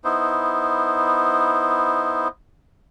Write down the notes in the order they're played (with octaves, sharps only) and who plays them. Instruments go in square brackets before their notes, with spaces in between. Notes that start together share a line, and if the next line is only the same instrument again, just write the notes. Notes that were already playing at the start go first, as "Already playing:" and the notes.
[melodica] B3 D#4 E4 C5